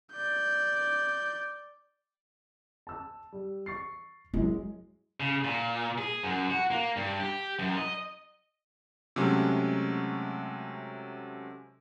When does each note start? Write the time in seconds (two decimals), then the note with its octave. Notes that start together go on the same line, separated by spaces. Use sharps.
0.12 D5 G6
2.87 A5 E6
3.32 G3
3.66 C#6 A6 C7
4.34 F#2 G#3 E4
5.20 C#3
5.44 A#2
5.98 G#4
6.23 F#2
6.50 F#4
6.71 A#3
6.97 G2
7.20 G4
7.59 F#2
7.77 D#5
9.16 C3 F#3 G#3 A3 C#4